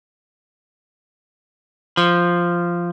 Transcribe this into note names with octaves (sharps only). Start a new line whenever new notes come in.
F3